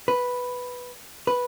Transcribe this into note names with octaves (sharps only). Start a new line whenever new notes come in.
B4
B4